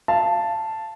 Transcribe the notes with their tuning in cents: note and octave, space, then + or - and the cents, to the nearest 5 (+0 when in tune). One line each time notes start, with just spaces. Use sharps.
F5 -25 A5 +0